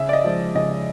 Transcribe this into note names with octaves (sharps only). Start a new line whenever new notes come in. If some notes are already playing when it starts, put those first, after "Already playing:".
Already playing: C#3 E5
D5
D#5
F3 G#3
C#3 D#5